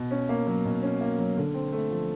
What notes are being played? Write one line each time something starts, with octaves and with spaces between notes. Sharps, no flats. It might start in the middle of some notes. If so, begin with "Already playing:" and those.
Already playing: B2
C#4
A#3
F#3
B2
C#4
A#3
F#3
D3
C4
A3
F3